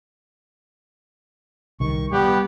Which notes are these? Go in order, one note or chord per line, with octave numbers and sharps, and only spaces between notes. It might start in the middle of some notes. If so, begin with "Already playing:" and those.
C2 D#3 C#6
G3 B3 G4 F#5